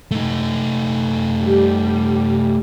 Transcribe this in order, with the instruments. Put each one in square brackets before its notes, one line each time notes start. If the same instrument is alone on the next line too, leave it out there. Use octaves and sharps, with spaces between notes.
[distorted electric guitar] A3 D#4
[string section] G3